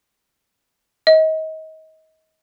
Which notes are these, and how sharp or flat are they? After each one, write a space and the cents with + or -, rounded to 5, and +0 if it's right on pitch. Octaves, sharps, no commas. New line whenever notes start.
D#5 +30